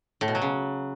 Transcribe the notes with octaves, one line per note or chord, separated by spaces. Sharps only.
A2
B2
F#3
C#3